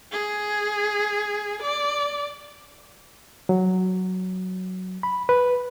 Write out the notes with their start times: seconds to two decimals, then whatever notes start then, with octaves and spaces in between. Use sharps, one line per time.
0.11 G#4
1.63 D5
3.49 F#3
5.03 B5
5.29 B4